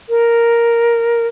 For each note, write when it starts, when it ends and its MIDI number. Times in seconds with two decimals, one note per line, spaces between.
0.09 1.27 70